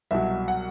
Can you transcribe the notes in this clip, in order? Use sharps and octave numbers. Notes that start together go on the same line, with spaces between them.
C2 B2 F#3 E5
F#5